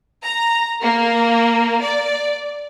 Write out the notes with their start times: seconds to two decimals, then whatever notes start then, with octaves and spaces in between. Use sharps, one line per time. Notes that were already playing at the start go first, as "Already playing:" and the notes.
0.23 A#5
0.81 A#3
1.82 D5